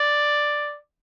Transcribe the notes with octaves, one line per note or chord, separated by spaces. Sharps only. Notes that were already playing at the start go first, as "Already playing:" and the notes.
Already playing: D5